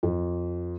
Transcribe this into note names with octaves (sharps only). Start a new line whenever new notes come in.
F2